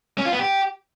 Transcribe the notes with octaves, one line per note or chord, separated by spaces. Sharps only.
C#4
F4
B3
G4